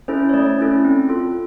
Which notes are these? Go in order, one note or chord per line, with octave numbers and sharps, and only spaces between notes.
C#4 E4 A4 C5
C#5
A3 D5
C#4 E4 A4
C4
F4 A4